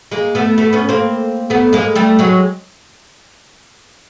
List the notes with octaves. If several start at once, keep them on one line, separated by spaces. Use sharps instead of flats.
G#3 A#3
A3 B3
A3 B3
B3 C#4
A#3 C4
A3 B3
G#3 A#3
G3 A3
F#3 G#3